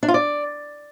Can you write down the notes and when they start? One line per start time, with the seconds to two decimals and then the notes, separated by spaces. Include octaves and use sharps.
0.03 D4
0.08 F4
0.14 D5